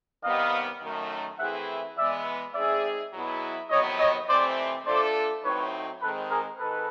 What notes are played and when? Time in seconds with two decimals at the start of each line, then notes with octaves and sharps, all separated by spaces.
0.23 C3 D#3 G3 B3 D#5 F5
0.81 F#2 D#3 F#3 A3
1.39 E3 A3 C4 E4 G#4 E5 F#5
1.97 E3 G#3 B3 D5 E5
2.54 G#3 C4 D#4 G#4 D5 E5
3.13 B2 F#3 B3 E4 G#4
3.70 F2 C3 D#3 F#3 B3 C#5 D#5
3.99 C#5 D#5
4.28 C3 E3 A3 C4 C5 D5
4.85 A3 D4 F4 A4 C5 D5
5.43 A2 F#3 A3 C4 D#4 B4 C#5
6.02 D#3 G#3 C4 A4 B4
6.31 G#4 A#4
6.60 G#2 D#3 A4 B4